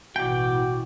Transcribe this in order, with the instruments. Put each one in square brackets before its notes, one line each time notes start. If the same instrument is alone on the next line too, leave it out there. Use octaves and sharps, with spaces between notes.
[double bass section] A1 B2 E3 [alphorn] F#4 [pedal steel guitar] D5 G5